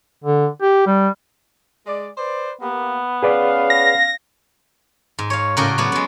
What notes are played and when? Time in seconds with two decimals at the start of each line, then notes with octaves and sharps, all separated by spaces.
0.24 D3
0.62 G4
0.87 G3
1.86 G#3 D5
2.18 B4 C5 D5
2.61 A#3 B3 G4
3.23 C#4 G#4 B4 D5 F5
3.70 A#6
5.19 G#2
5.30 C#5 F5
5.57 A2 C#3 F#4 A#4 D5 G5
5.78 F#3 B3 F#4 D5
5.92 G#3 B3